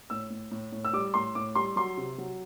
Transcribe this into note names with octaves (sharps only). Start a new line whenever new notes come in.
A2 E6
A2
A2
A2
E6
G3 D6
A2 C6
A2 D6
G3 C6
F#3 C6
C3
F#3